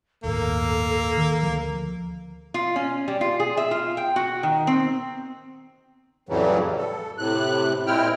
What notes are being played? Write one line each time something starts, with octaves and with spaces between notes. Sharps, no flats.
G1 D#2 A2 A#3 A4
D#3
D2 F3
F4
C#4
G3
F4
G#4
E5
F4
G5
F#4
D#3
C4
F2 A2 C#3 E3 F#3 G3
A4
A2 C3 F#6
A#2 G#3 C4 E4 G5 F6